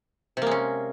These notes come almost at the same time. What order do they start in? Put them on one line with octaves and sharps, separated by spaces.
C3 A#3 G#3 C#4